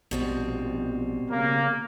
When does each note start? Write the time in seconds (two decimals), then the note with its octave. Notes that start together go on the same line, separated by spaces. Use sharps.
0.11 A#1 B2 G3 C4
1.31 C#3 A#3